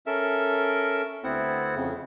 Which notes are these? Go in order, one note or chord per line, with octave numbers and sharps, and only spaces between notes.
C#4 A4 A#4 E5
D2 B3 C4 E4 F#5
F2 C#3